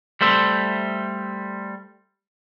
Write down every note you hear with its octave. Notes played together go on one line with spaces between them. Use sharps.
G3 A3 C5 E5